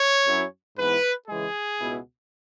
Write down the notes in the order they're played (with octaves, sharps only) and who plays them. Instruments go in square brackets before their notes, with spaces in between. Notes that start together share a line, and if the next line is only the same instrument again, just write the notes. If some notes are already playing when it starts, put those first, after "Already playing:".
Already playing: [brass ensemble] C#5
F#2 F#3 C#4 E4
G#2 E3 B3 E4 B4
C#3 E3 G#3 G#4
C#2 B2 B3 E4